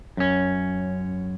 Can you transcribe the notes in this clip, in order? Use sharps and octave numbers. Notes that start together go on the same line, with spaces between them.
F#2 C#4